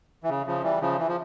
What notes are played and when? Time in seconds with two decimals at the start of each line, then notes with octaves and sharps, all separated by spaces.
0.23 E3
0.29 C#3
0.46 C#3 F3
0.63 E3 G3
0.81 C#3 F3
0.98 E3
1.07 F3